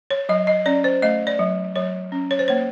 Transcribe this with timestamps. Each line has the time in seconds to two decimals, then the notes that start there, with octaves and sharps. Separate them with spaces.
0.11 C#5
0.29 F#3 D#5
0.47 D#5
0.66 C#4 D5
0.84 C5
1.02 A3 D#5
1.27 D5
1.39 F#3
1.76 F#3 C#5
2.12 C#4
2.31 C#5
2.39 C5
2.48 A#3 C#5